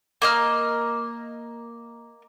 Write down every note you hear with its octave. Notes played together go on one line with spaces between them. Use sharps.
A#3 D#5 F6